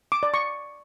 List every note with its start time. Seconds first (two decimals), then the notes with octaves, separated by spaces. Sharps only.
0.12 D6
0.23 D5
0.34 C#6